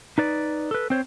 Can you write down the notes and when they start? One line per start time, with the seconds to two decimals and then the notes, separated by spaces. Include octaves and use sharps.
0.18 D#4 B4 D5
0.71 A4 B4
0.90 C4 C5 C#5